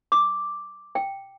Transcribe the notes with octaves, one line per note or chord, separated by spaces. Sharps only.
D6
G5